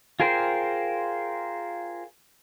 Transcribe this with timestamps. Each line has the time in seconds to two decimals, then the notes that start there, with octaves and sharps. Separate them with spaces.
0.20 F4 G#4 A#4 C5 G5